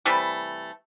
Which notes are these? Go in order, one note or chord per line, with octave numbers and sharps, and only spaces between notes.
C3 E3 G3 A3